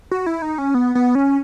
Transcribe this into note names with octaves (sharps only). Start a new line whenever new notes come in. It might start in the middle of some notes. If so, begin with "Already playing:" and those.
F#4
E4
D#4
C#4
B3
B3
C#4